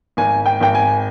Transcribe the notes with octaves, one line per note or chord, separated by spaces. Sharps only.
G#1 G#5
G5
G#1 G5
G#5